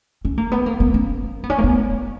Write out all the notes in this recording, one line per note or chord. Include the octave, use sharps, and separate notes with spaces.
C#4
A#3
B3
A#3
B3
C#4
B3
C#4
A#3
B3